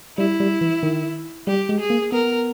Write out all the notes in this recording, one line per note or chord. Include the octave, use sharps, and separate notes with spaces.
G3 E4
G3
E3
D#3
G3 G4
G#3
G#4
A#3
B3 A#4